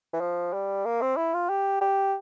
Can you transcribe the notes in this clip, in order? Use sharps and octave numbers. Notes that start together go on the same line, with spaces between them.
E3
F3
G3
A#3
C4
E4
F4
G4
G4